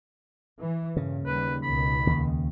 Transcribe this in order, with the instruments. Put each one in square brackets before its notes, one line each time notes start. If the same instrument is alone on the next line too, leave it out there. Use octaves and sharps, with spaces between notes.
[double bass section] E3
[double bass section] G2 A#2 [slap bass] C#3
[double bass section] D#2 G3 [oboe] B4
[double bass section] C#2 B2 D#3 [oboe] B5
[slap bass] D#2 C#3